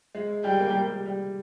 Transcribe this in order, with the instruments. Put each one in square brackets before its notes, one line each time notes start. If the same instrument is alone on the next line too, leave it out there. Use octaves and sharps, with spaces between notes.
[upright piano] G#3
[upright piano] G3 [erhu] G5
[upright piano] A#3
G3
G#3
G3
G3